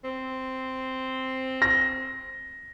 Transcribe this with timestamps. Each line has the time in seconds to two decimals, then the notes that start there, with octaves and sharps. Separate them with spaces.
0.04 C4
1.62 A#6